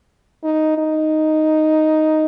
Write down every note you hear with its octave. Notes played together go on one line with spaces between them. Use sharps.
D#4
D#4